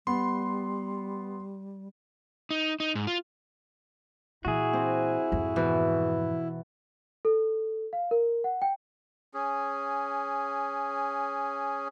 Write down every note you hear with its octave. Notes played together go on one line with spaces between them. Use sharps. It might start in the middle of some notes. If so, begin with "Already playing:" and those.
G3 B3 C6
D#4
D#4
G#2
F4
A#2 E3 E4 F#4 G#4
C4
F2 G#2
B2 E3
A4
F5
A#4
F#5
G5
C#4 G#4